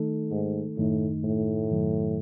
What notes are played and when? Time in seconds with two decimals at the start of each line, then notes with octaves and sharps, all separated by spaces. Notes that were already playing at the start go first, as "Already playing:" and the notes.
Already playing: D#3 A3 D#4 A4
0.31 G#2
0.77 F#2 A2 D#3 A3 D#4
1.24 A2
1.70 F#2 D#3 F#3